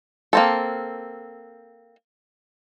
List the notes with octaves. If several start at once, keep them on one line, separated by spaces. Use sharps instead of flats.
A#3 C4 A4